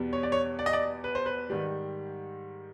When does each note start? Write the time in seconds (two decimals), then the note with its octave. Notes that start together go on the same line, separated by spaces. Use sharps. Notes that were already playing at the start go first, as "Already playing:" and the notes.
Already playing: E2 B2 G3 B3
0.13 C#5
0.23 D5
0.32 C#5
0.59 D5
0.66 D#5
0.73 D5
1.04 B4
1.15 C5
1.26 B4
1.50 G#2 D#3 G3